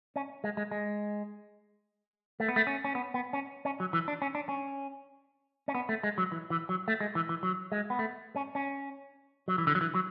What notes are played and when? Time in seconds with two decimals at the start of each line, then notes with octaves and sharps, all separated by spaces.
0.16 C#4
0.44 G#3
0.57 G#3
0.71 G#3
2.40 A3
2.48 B3
2.56 A3
2.67 C#4
2.85 C#4
2.95 B3
3.14 B3
3.33 C#4
3.65 C#4
3.80 F#3
3.93 E3
4.08 D4
4.22 C#4
4.35 D4
4.49 C#4
5.68 C#4
5.75 B3
5.89 A3
6.03 G#3
6.18 F#3
6.32 E3
6.50 E3
6.69 F#3
6.88 A3
7.00 G#3
7.15 E3
7.29 E3
7.43 F#3
7.72 G#3
7.90 B3
7.99 A3
8.36 C#4
8.55 C#4
9.48 F#3
9.58 E3
9.67 D3
9.75 F#3
9.81 E3
9.95 F#3